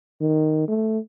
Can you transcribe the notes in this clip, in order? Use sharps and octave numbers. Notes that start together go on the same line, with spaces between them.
D#3
A3